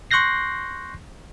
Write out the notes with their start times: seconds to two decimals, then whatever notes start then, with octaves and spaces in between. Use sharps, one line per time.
0.11 C6 C#6 F#6 G6 A#6 C7